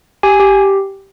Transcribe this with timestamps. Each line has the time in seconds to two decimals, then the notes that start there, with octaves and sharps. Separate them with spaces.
0.23 G4 G#5
0.40 G4